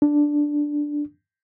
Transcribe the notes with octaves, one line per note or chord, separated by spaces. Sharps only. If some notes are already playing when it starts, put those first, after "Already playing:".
D4